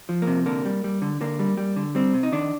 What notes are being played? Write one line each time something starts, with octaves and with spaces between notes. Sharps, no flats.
F3
A#3
C3
D3 A#3
G3
G3
D3
D3 A#3
G3
G3
D3
G3 C4
C3
D#4
D#3 D4